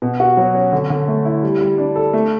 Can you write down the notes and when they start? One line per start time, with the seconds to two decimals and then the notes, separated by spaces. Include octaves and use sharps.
0.02 B2
0.20 F#4
0.37 F#3
0.55 C#4
0.72 D3
0.90 D3
1.08 A3
1.25 E4
1.43 G3
1.61 G3
1.78 D4
1.96 A4
2.13 A3